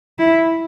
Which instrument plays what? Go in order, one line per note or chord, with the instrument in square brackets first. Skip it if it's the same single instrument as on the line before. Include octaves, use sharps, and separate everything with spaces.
[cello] E4